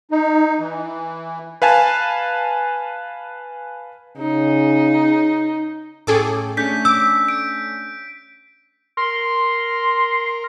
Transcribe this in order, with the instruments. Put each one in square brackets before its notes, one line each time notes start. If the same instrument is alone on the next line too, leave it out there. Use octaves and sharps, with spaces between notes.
[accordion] D#4
E3
[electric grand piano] B4 F5 G#5 A5
[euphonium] C#3 [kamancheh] D#4
[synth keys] A2 C#4 G5 [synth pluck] G#4 A4 D6
[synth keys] A3 C#4 D4 [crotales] G6 B6
[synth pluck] D6 [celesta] E6
[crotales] D7
[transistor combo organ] A#4 [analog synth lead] C6